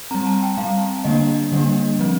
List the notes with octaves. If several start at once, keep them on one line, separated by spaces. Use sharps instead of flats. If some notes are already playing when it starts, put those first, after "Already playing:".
G3 C4 A#5
A5
G5
G3 C4 F5
D3 G3 A#3 D4 D#5
D3 G3 A#3 D4
F3 C4